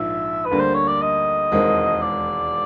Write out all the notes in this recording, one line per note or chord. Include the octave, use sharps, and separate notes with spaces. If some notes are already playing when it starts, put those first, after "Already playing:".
Already playing: A#1 G#2 F3 E5
B4
D2 D3 G3 A#3
C5
C#5
D5
D#5
E1 D#2 D#3 G#3 C4
D5